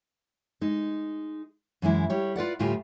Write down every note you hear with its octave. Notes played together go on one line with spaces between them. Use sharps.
G#3 D#4
F#2 E3 G#3 E4
G3 G4 C#5
F4 B4 D5 F#5
D2 A2 G3 F4 G4 G#5